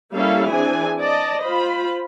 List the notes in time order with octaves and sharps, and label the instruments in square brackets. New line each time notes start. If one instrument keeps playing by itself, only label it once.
[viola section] G3 A#3 C#4 E4 A4 F5
E3 C4 D4 G#4 G#5
D5 D#5 A5
F4 C5 B5